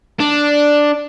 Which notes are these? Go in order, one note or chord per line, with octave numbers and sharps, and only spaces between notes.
D4